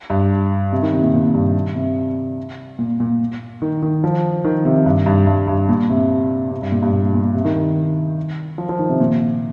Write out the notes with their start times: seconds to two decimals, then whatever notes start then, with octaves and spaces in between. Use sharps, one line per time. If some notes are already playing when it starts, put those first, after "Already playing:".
0.10 G2
0.72 C3
0.82 D#3
0.93 C3
1.03 A#2
1.13 A#2
1.34 G2
1.75 C3
2.79 A#2
3.00 A#2
3.62 D#3
3.82 D#3
4.04 F3
4.44 D#3
4.65 C3
4.86 G2
5.06 G2
5.27 G2
5.48 G2
5.69 A#2
5.90 C3
6.51 C3
6.62 G2
6.72 A#2
6.82 G2
6.93 A#2
7.13 A#2
7.34 C3
7.45 D#3
7.55 D#3
8.58 F3
8.69 F3
8.79 D#3
8.89 C3
9.00 A#2